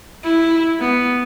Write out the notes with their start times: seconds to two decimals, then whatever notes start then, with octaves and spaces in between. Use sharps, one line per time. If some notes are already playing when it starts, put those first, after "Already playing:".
0.24 E4
0.80 B3